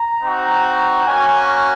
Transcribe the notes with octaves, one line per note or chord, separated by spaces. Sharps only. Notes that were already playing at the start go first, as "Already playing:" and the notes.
Already playing: A#5
C4 D#4 F#4
A#3 C#4 F#4 G#5